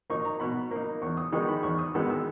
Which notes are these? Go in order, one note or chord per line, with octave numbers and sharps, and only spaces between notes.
A#3 D#4 C#6
A#5
B2 B5
A#3 D#4
E2 C#6
D#6
D#3 G#3 B3 D#4 C#6
B5
E2 C#6
D#6
D#3 G#3 B3 D#4 E6
E6